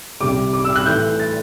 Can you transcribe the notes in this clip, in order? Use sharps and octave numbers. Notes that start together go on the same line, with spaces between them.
C2 C3 G3 D6
D6
E6
F#6
A2 E3 A3 G6
A6